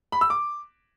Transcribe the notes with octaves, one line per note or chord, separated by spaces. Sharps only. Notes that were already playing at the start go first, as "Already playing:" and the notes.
B5
E6
D6